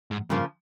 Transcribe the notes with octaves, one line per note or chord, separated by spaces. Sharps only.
G#2
G2 C#3 F3 A#3